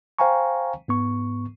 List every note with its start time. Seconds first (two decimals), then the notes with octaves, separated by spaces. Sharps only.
0.19 C5 F5 G5 G#5 A#5 C#6
0.88 G#2 B3 C#6